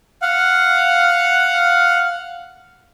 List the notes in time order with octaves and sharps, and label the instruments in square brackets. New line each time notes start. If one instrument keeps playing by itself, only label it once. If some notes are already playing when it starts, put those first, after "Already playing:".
[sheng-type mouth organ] F5 F#5